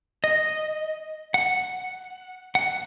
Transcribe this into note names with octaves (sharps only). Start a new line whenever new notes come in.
D#5
F#5
F#5